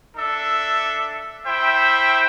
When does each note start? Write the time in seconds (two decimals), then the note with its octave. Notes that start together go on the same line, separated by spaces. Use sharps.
0.15 D4 A4 E5
1.46 E4 C5 E5 G5